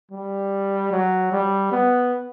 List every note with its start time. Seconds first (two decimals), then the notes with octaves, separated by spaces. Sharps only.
0.11 G3
0.92 F#3
1.32 G3
1.72 B3